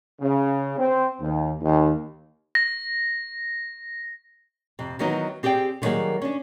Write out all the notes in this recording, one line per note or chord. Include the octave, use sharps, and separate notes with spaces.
C#3
C4
D#2
D#2
A#6
F2 C3
D#3 E3 F#3 B3 D#4
C4 G4 G#4 D5 G5
D3 D#3 F#3 G3 A#3 G#4
C#4 D4